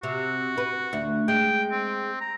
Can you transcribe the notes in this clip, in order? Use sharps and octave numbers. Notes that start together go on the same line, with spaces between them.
C3 F#4
B4
D2
G#3 G5
C4
A#5